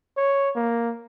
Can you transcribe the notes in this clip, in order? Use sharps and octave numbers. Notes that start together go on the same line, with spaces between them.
C#5
A#3